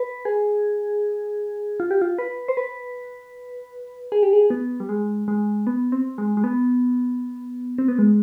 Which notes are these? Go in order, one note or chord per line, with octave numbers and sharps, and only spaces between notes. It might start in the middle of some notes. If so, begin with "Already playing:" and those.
Already playing: B4
G#4
F4
G4
F4
B4
C5
B4
G#4
G4
G#4
B3
G3
G#3
G#3
B3
C4
G#3
G#3
B3
C4
B3
G#3